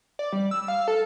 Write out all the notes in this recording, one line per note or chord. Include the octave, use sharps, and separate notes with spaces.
D5
G3
E6
F5
A4